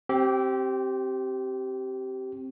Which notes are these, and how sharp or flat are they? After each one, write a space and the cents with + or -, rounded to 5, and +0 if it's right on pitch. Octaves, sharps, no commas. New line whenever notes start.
C4 +10 G4 -20